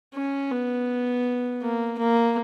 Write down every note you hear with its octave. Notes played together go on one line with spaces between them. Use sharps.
C#4
B3
A#3
A#3